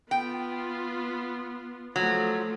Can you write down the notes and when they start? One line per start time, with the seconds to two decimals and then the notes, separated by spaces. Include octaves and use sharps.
0.11 B3 F4 G5
1.96 F3 F#3 A3